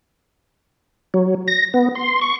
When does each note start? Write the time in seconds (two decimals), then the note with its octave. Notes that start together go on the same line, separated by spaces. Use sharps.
1.14 F#3
1.48 A#6
1.74 B3
1.95 C6
2.21 C#6